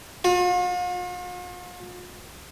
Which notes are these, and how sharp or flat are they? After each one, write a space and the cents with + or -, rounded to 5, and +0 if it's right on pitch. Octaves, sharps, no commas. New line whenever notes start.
F4 +45